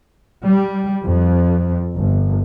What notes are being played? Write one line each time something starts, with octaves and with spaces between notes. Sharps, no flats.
G3
F2
G1